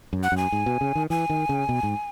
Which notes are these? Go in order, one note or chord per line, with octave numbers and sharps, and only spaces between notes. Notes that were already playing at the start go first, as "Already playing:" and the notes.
F#2
F#5
F#2
G#5
G#2
B2
C#3
D#3
E3 G#5
D#3
C#3
B2
G#2